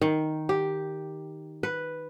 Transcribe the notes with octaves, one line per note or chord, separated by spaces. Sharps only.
D#3
G4
B4